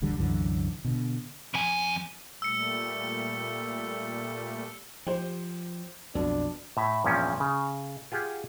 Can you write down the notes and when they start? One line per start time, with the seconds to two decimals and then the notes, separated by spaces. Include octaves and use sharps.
0.02 D1 A1 D3 G3
0.19 C2 F#2 D3 E3
0.85 B2 D3
1.54 F2 G#5
2.42 A#2 G3 A3 E6 C#7
5.07 F3 G4 C5
6.15 B1 F2 B2 D4
6.77 A2 E5
7.04 E2 G2 A#2 F3 C#4
7.40 C#3
8.12 F4 G4 G#4 F#5